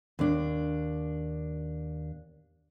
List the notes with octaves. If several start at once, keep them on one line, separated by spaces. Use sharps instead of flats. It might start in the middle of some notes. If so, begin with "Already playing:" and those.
D#2 D4